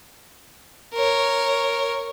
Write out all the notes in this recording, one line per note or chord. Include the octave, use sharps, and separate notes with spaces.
A#4 C#5